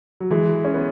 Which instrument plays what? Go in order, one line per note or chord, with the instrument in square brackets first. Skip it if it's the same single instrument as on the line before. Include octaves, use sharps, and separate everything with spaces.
[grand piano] F#3
E3 G#3
C#4
B3